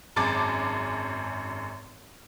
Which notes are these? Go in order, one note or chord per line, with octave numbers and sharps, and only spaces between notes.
G#1 F#2 G#4 A5 D6 A6